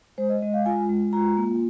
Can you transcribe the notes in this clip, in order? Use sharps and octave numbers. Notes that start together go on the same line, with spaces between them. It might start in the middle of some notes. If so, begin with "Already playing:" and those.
G#3 C5
D#5
G#3 D#5
F5
F4 G#5
G#3
F4 A#5
A#3